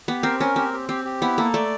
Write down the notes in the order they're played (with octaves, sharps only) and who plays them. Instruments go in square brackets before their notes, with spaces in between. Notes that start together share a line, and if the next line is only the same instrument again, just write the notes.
[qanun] B3 [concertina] G4
[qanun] C4 [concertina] A#4
[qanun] C#4 [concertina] A#4
[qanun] C4 [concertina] G4
[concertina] G4
[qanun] C4 [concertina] G4
[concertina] G4
[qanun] B3 [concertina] E4
[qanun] A#3 [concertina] A4
[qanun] A3 [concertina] D5